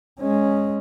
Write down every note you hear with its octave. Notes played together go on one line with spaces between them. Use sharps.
G#3 C#4